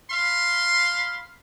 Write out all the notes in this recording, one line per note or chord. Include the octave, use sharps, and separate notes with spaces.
F5 B5 C6